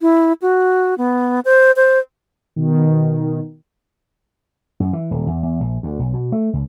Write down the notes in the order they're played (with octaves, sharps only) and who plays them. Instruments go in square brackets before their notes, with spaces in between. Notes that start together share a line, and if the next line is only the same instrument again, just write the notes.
[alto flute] E4
F#4
B3
C5
C5
[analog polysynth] B2 D#3
[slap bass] F#2
E3
D#1
E2
E2
A#1
D2
B1
B2
A3
C#2